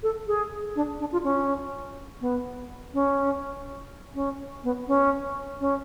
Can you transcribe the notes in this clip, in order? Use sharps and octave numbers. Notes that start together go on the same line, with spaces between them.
A4
G#4
D4
D4
F4
C#4
B3
C#4
C#4
B3
C#4
C#4